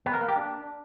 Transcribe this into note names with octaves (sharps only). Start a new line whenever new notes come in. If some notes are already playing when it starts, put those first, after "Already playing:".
B3
A#4
A#3
G4
D4